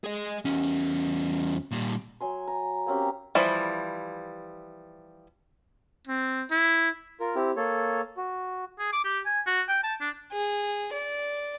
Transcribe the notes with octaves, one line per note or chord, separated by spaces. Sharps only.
G#4 D#5
E2 C#4
A#2 G3
F#3 G#5 C6
A#5
A#3 C4 C#4 G4
E3 F3 G3 E4
C4
E4
F4 A#4
C4 E4 G4
A#3 A4 C#5
F#4
G#4
D6
G4
G#5
F#4
G5
A5
D4
G#4
D5